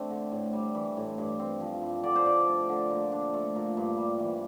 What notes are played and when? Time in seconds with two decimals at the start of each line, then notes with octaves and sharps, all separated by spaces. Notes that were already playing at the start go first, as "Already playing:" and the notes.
Already playing: A3 C4 D4 C5
0.10 D3
0.32 A2
0.53 G3
0.75 E3
0.97 A2
1.18 G2
1.39 C4
1.60 F3
1.82 G2
2.03 D3 D5
2.15 C5
2.25 D4 D5
2.47 A3
2.69 D3
2.90 A#2
3.12 D4
3.34 A3
3.55 A#2
3.77 G2
3.97 G3
4.20 E3